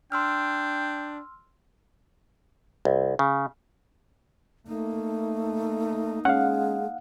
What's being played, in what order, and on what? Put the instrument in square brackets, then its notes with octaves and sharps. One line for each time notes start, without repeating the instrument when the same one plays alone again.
[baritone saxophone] D4 [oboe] G5 [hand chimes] C6 E6 F6
[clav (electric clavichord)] C2
C#3
[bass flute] A3 [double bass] A#3 D#4
[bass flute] G#3 [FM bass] C#4 [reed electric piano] F5 F#5